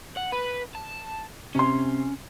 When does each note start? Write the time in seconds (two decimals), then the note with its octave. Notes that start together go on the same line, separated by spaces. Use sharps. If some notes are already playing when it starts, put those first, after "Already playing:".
0.17 F#5
0.32 B4
0.75 A5
1.55 C3 C#4 C6